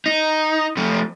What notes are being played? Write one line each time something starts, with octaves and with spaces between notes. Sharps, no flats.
D#4
F2 A3